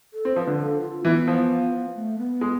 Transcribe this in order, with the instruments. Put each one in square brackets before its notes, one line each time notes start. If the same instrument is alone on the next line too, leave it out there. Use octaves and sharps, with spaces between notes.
[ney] A4
[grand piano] C4
[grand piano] F3 [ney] C5
[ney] B4
[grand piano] D3
[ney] A4
F4
[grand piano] E3 [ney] B3
[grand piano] F3
[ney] A3
B3
[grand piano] G#3